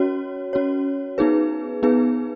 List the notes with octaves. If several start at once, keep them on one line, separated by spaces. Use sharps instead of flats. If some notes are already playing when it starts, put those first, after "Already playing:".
Already playing: C#4 F#4 C#5
C#4 F#4 C#5
B3 D#4 G#4 B4
B3 D#4 G#4 B4